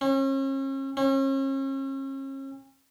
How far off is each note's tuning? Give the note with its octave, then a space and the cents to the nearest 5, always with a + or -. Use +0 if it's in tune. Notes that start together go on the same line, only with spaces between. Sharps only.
C#4 -40
C#4 -40